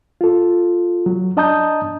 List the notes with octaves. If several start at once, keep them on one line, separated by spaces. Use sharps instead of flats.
F4 A4
F#3
D4 D#5 A5 A#5 D#6 G6